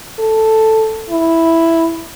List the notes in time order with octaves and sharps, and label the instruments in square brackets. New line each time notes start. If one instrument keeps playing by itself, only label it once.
[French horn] A4
E4